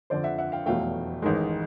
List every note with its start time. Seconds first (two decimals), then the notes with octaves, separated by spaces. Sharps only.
0.10 F2 D3 F3 C5 D5
0.24 E5 F#5
0.38 E5 F#5
0.52 F5 G5
0.66 F1 E2 B2 F#3 A3 F5 G5
1.22 A1 G#2 D#3 G#3